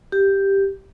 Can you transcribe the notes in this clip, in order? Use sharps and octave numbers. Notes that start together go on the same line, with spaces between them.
G4